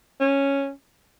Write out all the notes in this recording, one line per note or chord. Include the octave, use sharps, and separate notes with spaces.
C#4